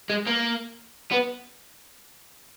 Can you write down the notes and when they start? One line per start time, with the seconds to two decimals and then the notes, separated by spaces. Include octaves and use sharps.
0.10 G#3
0.27 A#3
1.12 B3